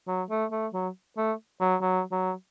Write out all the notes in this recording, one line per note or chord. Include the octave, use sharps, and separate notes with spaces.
F#3
A3
A3
F#3
A3
F#3
F#3
F#3